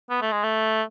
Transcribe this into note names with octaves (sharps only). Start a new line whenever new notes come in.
B3
A3
G#3
A3